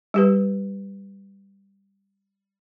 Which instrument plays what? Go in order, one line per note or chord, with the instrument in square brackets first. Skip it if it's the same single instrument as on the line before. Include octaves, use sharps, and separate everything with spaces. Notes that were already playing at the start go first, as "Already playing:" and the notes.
[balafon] G3 G4 B4